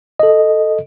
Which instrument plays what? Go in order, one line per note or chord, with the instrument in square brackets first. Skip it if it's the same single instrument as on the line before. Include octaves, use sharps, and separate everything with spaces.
[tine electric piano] A4 D#5